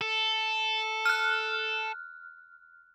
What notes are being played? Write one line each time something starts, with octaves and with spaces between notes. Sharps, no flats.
A4
F6 F#6